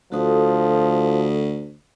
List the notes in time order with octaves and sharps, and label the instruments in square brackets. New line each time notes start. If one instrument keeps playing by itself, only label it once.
[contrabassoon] D2 [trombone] F3 [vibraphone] F#4 A4 D#6